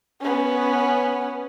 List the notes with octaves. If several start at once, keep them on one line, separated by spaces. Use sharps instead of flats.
B3 C#4